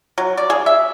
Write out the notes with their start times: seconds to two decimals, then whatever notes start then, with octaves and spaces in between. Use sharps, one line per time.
0.18 F#3
0.37 D5
0.50 G#4
0.66 E5